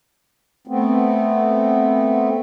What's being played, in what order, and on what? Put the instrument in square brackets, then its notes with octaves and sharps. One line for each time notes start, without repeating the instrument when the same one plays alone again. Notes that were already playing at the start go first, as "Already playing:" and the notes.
[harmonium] A3 B3 C4